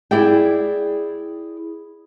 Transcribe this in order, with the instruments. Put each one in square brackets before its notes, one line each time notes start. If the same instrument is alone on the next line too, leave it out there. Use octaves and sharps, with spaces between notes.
[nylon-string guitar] E4 G#4 D5 E5 G5